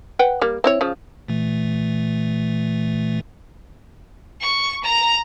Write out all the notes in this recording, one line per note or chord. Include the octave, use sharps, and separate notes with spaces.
B4 F#5 G5
G3 A#3
C4 E4 C#5
C#3 F3
A#2 E3 A3
C#6
A#5